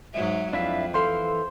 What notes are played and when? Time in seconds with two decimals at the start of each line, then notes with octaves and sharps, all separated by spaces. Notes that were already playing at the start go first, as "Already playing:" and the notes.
0.13 G#2 F#3 G#3 E5
0.53 F2 D4 E4 E5 F5
0.94 E3 A4 C5 F5 C6